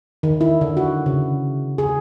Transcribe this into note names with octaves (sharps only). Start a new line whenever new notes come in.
D#3
E4
D3
F#4
C#3
G#4